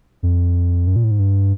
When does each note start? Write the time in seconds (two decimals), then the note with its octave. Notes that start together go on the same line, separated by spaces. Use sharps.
0.23 F2
0.87 F#2
0.96 A#2
1.04 A2
1.11 G#2
1.19 G2